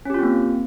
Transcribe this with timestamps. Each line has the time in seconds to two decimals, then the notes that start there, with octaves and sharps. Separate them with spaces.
0.05 C#4
0.10 G4
0.14 F4
0.19 C4
0.23 A#3